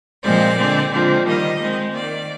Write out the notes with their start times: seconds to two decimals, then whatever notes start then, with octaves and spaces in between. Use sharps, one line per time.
0.22 A#2 F3 G#3 C4 D5
0.57 D3 G#3 C4
0.91 D3 F3 G#3 C4
1.26 D#3 G3 A#3 D#5
1.60 D#3 G#3 C4
1.94 D#3 A#3 D5